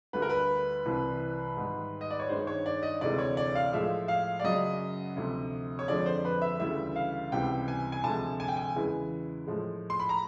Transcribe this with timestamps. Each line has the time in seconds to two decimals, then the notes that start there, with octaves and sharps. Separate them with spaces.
0.13 D2 D3 G3 B4
0.22 A#4
0.30 B4
0.86 C2 C3 E3
1.57 G#2 D#3 G3
2.01 D#5
2.11 D5
2.20 C#5
2.29 G2 D#3 G#3 C5
2.47 C#5
2.66 D5
2.83 D#5
3.01 D2 C3 E3 G#3 D5
3.18 C#5
3.37 D5
3.55 F5
3.73 A2 F3 G#3 E5
4.08 F5
4.40 D5
4.44 F#2 C#3 F#3 D#5
5.16 D2 C3 F3
5.79 C#5
5.88 F2 D3 F3 G#3 D5
6.06 C5
6.25 B4
6.42 E5
6.60 D2 C#3 E3 G3 E5
6.96 F5
7.32 C#2 C3 E3 G3 G5
7.68 G#5
7.92 G#5
8.04 D2 C3 F3 G#3 A5
8.40 G#5
8.48 G5
8.57 G#5
8.76 E2 C#3 E3 G#3
9.47 A2 F3 G#3
9.90 C6
10.00 B5
10.09 A#5